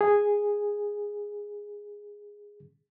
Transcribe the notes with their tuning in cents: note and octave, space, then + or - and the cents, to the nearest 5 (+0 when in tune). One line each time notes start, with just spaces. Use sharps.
G#4 -10